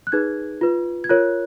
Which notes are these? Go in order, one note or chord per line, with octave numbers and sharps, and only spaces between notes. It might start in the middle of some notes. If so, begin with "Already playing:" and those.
F#6
D#4 G#4 B4 G#6
F4 B4
G#6
F4 A#4 C#5 F#6